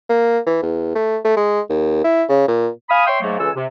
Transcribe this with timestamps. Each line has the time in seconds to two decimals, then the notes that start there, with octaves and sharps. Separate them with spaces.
0.09 A#3
0.46 E3
0.62 E2
0.95 A3
1.25 A3
1.37 G#3
1.69 D#2
2.04 E4
2.29 C#3
2.48 A#2
2.89 F5 G#5 B5 D#6
3.06 C#5 E5 G5 C6
3.21 G#2 F#3 A3 A#3
3.39 C#2 E3 A4 G#5 E6
3.55 C3